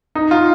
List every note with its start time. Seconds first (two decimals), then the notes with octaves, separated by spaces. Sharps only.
0.15 D#4
0.31 F4